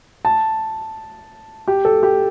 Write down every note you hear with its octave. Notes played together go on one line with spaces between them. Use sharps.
A5
G4
A4
G4